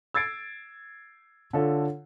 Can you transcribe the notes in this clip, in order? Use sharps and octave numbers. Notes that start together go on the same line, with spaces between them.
E6 G#6 A6 C7 D7
D3 F4 A4 C#5